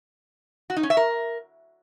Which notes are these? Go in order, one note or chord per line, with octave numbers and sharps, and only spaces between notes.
F#4
D#4
C#4
E5
A#4